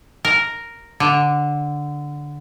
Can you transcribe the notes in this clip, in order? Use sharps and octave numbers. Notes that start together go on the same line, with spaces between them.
A#4
D3